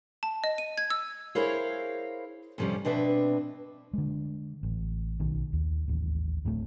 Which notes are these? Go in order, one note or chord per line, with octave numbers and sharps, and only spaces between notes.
A5
D#5
D#7
G#6
E6
E4 G#4 A#4 C5 C#5 F5
F2 C3 F3 G3 C#4
B2 C4 D4 B4 E5
D3 G#3
A1
B1 D#3
D#2
A1 D#2
D1 A2 A3